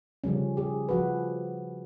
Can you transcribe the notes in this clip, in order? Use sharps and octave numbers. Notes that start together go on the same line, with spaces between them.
C#3 F3 G3 C#4
G4 G#4
F3 F#4 B4